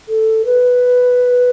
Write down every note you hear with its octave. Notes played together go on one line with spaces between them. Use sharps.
A4
B4